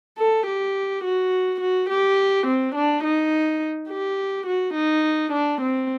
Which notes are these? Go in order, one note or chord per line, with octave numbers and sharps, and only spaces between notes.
A4
G4
F#4
F#4
G4
C4
D4
D#4
G4
F#4
D#4
D4
C4